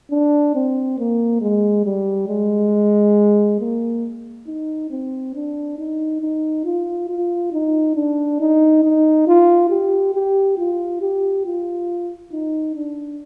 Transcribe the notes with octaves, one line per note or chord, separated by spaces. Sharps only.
D4
C4
A#3
G#3
G3
G#3
A#3
D#4
C4
D4
D#4
D#4
F4
F4
D#4
D4
D#4
D#4
F4
G4
G4
F4
G4
F4
D#4
D4